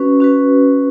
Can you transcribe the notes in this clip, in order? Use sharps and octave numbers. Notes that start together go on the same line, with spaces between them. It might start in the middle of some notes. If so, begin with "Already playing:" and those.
Already playing: C#4 F#4 B4
C#4 F#4 B4